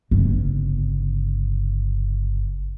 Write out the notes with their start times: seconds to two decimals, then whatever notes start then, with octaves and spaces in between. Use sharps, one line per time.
0.11 G1 C#3